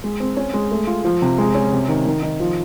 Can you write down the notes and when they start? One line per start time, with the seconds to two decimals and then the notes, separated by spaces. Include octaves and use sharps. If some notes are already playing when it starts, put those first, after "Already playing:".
0.04 G#3
0.20 C4
0.37 C#4
0.54 G#3
0.71 A3
0.87 F4
1.05 F3
1.22 C3
1.38 G#3
1.55 C#4
1.72 C3
1.88 D#3
2.06 D#3
2.23 D#3
2.40 F3